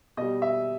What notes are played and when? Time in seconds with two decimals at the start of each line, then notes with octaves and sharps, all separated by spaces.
0.17 B2 G3 D#5
0.42 E5